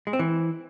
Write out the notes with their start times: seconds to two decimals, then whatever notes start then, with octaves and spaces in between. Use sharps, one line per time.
0.07 G#3
0.13 C4
0.19 E3